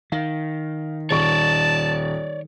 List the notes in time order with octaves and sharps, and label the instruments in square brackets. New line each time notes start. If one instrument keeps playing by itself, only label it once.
[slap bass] D#3 [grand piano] F5
[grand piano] D#1 C#6 [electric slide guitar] C#5 D5 [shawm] A5